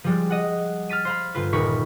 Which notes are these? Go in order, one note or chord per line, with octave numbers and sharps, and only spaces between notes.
F3 G3 G#3
D#5 F#5
F6 A6 B6 D#7
C5 F5 B5
G1 F4 B4
D#1 A#2 D#4 B5 C#6 B6